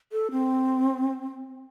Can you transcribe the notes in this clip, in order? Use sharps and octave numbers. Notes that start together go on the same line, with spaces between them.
A4
C4